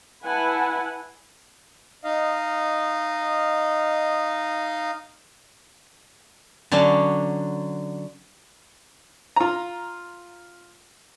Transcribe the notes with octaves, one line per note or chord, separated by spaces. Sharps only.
E4 B4 F#5 G#5 A5
D#4 D#5 F5
D3 F#3 C#4 D4
F4 A#5